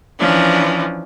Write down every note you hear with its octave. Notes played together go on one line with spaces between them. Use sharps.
E3 F3 C#4 D4